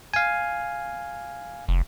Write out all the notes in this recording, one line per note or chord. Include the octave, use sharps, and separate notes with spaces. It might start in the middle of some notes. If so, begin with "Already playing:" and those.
F5 G#5
F1